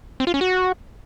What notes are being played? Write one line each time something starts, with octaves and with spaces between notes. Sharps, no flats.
C4
F4
C#4
F#4